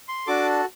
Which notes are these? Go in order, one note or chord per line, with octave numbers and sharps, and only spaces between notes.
C6
D4 F#4 A4 D6